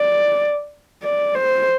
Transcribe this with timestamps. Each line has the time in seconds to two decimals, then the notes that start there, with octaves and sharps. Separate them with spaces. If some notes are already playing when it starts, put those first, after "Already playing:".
Already playing: D5
1.04 D5
1.35 C5